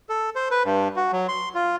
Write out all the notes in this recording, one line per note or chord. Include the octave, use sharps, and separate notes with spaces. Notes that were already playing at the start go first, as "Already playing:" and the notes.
A4
C5
B4
G2
F#4
F#3
C6
F4